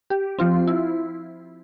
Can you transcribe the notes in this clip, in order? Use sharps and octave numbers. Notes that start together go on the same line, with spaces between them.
G4
F3 C4 F4
E4